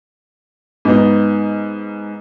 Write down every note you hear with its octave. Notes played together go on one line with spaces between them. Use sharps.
G#2 B3 D#4